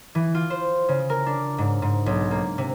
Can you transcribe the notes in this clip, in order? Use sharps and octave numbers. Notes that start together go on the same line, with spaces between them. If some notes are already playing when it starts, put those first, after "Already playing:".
E3
F4
C5
C#3
A#4
D4
G#2
G#2
B1
A#3
C3